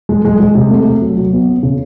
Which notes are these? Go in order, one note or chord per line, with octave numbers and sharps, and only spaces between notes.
G#3
G#3
G#3
C3
A3
A3
F#3
F#3
B3
C#4
C#3